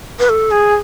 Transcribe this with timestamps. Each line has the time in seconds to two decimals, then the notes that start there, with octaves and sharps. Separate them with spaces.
0.19 B4
0.29 A4
0.51 G#4